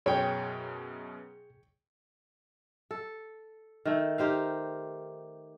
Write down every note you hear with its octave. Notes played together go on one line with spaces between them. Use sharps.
F#2 B2 G#4 C#5 G5
A4
D#3 A3
D#4 G4 C5 F5